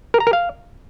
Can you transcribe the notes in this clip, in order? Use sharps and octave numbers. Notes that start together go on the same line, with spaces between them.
A#4
A#5
A#4
F5